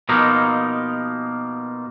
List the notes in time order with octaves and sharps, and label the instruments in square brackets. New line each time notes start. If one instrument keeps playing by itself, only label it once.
[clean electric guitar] B2 F3 A#3 D#4